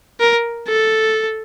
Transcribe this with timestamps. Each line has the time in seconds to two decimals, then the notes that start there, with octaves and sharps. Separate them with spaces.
0.20 A#4
0.68 A4